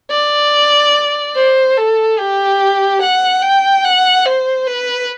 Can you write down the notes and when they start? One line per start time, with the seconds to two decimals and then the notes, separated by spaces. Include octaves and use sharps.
0.10 D5
1.35 C5
1.77 A4
2.18 G4
3.01 F#5
3.42 G5
3.84 F#5
4.25 C5
4.67 B4